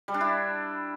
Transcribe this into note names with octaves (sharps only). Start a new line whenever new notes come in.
G3
D4
E4